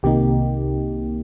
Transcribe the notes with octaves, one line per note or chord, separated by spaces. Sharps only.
C2 C3 D#3 A#3 D#4 G4